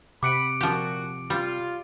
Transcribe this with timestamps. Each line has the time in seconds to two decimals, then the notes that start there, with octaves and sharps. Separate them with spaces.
0.23 C3 F#5 B5 D6 C#7 D7
0.61 A#2 F3 F#4 G4
1.30 G3 F4